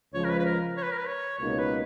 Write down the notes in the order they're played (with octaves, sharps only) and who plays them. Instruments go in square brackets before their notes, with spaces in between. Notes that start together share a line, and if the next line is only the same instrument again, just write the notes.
[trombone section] C#2 C#3 F3 G#3 [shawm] C#5
[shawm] A#4
B4
B4
A#4
C#5
B4
A#4
B4
C#5
[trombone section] C#2 B2 A#3 D#4 [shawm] C#5
[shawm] B4